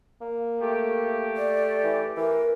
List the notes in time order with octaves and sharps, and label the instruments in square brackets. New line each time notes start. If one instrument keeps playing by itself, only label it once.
[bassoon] A#3
[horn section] A3 G4
[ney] D5
[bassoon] E3
[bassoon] E3 [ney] A#4